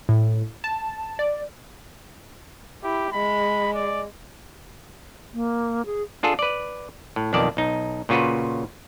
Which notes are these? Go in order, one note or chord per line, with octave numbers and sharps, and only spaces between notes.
A2
A5
D5
E4 G4
G#3 B5
D5
A#3
G#4
D4 F4 G#4 A4
B4 D5
A2
B1 F2 D#3 D5 A5
B1 D#4
A#2 C#3 F4 F#4 B4